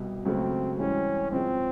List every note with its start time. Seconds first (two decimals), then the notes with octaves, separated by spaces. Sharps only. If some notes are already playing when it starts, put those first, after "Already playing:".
Already playing: C2 B2 G3
0.25 C#2 C#3 F#3 A3 C4 C#4
0.78 G#2 E3 G3 C4 C#4
1.30 G#2 F3 G#3 C4